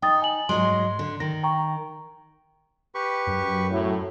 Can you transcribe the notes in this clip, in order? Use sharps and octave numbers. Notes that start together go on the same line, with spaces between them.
D#4 G5 D#6 A6
G#5 F#7
G#2 F#3 G#3 C6
D3
D#3 A#6
G5 A#5 C#6
G4 B4 C#6
F#2
A2 F#3